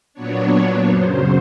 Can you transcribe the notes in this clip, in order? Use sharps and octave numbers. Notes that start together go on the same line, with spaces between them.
A#2 F#3 B3 D4 C#5
F#2 C#3 F#3 C5